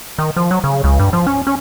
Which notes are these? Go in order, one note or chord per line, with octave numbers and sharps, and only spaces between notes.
D#3
F3
F#3
C#3
C#2
G2
F3
C#4
C#4